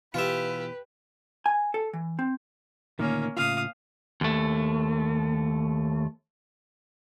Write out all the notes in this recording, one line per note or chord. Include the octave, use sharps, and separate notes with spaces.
B2 E3 F4 G4 B4 E5
G#5
A4
E3
C4
D2 A#2 D#3 A#3 C#4
A2 C#3 F4 F5 D#6
D#2 A3